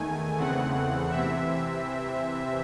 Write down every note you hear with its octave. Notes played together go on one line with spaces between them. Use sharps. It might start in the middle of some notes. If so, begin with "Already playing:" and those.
Already playing: E2 D#3 A3 G#5
E2 C#3 E3 A3 C4 F#5
C3 E3 C4 E5